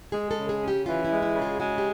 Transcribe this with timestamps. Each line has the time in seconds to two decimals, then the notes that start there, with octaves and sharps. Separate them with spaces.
0.12 G#3 G#4
0.31 A4
0.37 C#3
0.49 G#4
0.62 C#4
0.68 G4
0.86 E3 F4
1.04 E4
1.11 G#3
1.22 E4
1.35 C#3
1.42 F4
1.60 G#3 F#4
1.78 G4